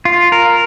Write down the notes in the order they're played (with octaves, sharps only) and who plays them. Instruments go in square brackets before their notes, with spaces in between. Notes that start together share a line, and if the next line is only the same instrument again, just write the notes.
[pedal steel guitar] F4
A#4